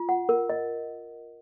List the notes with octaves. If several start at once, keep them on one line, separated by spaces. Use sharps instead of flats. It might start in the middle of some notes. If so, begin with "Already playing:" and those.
Already playing: F4
F#5
A#4
D#5